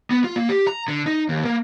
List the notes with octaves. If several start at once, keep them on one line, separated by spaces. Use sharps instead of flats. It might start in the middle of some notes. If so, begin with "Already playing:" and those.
B3
F4
A#3
G4
A#5
D3
D#4
D#2
A#3